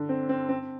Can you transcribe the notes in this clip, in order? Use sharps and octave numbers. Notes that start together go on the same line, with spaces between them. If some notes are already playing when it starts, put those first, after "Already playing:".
Already playing: D3
C4
C4
C4